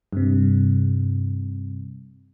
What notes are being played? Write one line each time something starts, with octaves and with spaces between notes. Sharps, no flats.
G2 C3